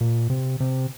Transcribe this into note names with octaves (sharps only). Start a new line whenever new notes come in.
A#2
C3
C3